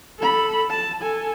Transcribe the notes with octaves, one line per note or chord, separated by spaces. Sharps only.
A4 B5
A5
A4 G#5